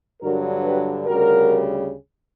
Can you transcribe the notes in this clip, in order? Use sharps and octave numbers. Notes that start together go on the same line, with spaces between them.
G2 D3 F#3 F#4 A#4
G4 B4
D2 C#3 G3 F#4 A#4